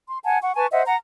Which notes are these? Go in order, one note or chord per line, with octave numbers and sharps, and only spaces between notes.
C6
F#5 G#5 A5
F#5 C#6
B4 G#5 A5 C#6
C5 D#5 E5 F#5
F#5 A#5